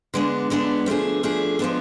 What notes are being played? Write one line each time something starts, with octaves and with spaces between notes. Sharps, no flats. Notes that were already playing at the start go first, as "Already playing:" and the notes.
D3 G#3 B3 D4
D3 G#3 B3 D4
F3 A3 D4 G#4
F3 A3 D4 G#4
F3 G#3 B3 D4